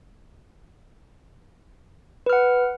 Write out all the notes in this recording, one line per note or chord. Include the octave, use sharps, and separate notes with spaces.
B4 F#5 F6